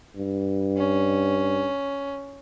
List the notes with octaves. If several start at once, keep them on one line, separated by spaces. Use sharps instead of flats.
G2
C#4